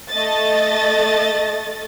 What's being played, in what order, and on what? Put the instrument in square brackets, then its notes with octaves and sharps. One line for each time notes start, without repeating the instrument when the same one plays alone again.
[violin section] A3 D#5 A6